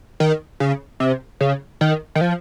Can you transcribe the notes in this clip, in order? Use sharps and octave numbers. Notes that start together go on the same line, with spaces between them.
D#3
C#3
C3
C#3
D#3
D#3
F3